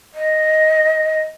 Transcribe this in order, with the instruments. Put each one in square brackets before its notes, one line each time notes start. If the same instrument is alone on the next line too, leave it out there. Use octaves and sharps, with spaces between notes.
[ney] D#5